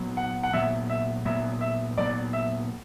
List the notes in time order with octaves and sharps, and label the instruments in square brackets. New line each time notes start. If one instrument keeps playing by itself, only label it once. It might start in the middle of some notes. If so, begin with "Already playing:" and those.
Already playing: [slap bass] A#2 F#3 B3
[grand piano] F#5
F#5
[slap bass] A#2 F#3 B3 [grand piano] E5
[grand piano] E5
[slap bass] A#2 F#3 B3 [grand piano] E5
[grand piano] E5
[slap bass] A#2 F#3 B3 [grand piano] D5
[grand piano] E5